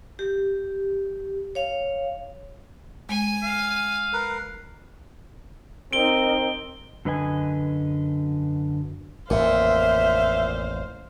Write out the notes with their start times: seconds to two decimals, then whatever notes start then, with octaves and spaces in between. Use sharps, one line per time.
0.19 G4
1.55 C#5 F5
3.09 G#3 G#5
3.43 F5
4.13 A#4 B4
5.93 C4 D#4 A#4 D7 G7
7.05 F#2 D3 B4 D#5 G#5
9.30 A1 F2 A#2 C5 E5 F5